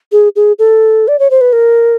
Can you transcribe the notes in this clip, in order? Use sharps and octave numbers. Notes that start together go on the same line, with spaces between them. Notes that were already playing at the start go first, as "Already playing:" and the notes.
G#4
G#4
A4
D5
C#5
C5
B4
A#4